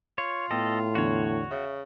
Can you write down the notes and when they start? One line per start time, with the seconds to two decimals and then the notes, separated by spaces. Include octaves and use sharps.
0.18 F4 C#5
0.51 A2 B3 A4 D#5 G5
0.95 E2 D3 F#4 C#5
1.51 C#3 E5